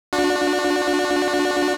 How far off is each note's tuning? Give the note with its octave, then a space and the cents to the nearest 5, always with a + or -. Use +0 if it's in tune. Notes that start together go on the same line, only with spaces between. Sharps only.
D4 +0 F#4 -35